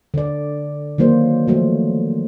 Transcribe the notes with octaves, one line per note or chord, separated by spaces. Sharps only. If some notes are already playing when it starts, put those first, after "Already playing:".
D3 D5
D#3 F#3 A#3 C5 D5
F3 F#3 A3